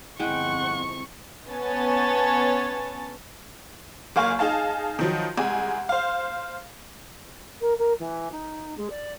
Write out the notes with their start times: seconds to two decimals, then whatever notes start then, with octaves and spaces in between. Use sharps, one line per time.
0.20 G1 F2 G#3 C4 E4 F#5 G5 C#6
1.49 B3 C#4 C#5 G#5 A5 A6
4.16 F#1 A#3 F5 G#5 C#6
4.39 D#4 G#4 F5 A5
4.99 D#3 F3 F#3
5.38 C2 G#3 G#5
5.89 C5 F5
7.60 A#4
7.78 A#4
7.99 E3
8.31 D#4
8.77 G#3
8.89 D5